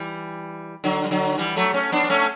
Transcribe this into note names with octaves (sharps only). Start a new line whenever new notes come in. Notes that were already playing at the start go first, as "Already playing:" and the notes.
Already playing: E3 G3
D3 F#3
G3
D3 F#3
E3 G3
F#3 A3
A3 C#4
B3 D4
B3
A3 C#4